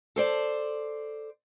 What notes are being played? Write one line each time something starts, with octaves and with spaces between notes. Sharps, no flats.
A4 C5 D5